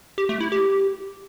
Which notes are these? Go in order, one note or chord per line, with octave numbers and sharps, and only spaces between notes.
G4
A3
E4
G4